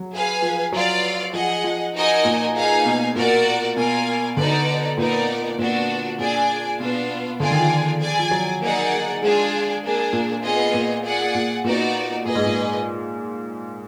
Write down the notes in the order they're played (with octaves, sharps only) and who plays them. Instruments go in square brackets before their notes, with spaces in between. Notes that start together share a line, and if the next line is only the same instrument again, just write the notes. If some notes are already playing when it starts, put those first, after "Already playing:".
Already playing: [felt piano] F#3
[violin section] G#4 B4 F5 G#5
[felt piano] F3
[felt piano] F#3 [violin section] F4 B4 D5 F5
[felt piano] F3 [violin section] G#4 D#5 F#5
[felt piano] F3
[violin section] D#4 F#4 A#4 D#5 G#5
[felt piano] A#2
[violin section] D#4 G#4 B4 F5 G#5
[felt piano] B2
[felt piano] A#2 [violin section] F#4 A#4 D5 F#5
[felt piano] B2 [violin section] F4 A#4 D5 F5 G#5
[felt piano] D3 [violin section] D#4 F#4 B4 D5
[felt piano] A#2 [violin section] B3 D#4 A#4 D5
[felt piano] A#2 [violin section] B3 D4 F#4
[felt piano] A#2 [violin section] D4 G#4 D5 G#5
[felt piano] B2 [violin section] B3 D4 F4
[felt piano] D3 [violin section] F4 G#4 D5 G#5
[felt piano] D#3
F3
[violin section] G#4 D5 G#5
[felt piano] F3
F#3
[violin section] A#3 D#4 G#4 D5 F#5
[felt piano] G#3 [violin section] D4 F4 G#4 D5
[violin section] A#3 D4 G#4
[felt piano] A#2
[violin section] B3 F4 G#4 D#5
[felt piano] A#2
[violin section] G#4 D5 F#5
[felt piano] A#2
[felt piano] A#2 [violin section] B3 D#4 F#4 D5
[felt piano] A#2 [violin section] G#4 B4 D#5
[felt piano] G#2
A#2